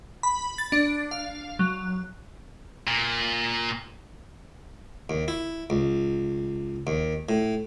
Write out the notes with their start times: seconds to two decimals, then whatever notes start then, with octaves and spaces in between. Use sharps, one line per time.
0.23 B5
0.58 A6
0.72 D4
1.11 F5
1.59 F#3
2.87 A#2
5.10 D#2
5.28 E4
5.70 C#2
6.87 D#2
7.29 A2